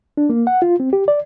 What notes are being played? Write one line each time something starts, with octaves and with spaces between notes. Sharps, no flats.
D4
A#3
F#5
F4
C4
G4
D5